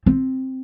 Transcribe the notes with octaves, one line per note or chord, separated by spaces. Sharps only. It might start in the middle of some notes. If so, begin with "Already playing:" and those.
C4